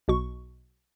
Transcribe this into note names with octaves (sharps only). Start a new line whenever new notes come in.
B1 B2 C#6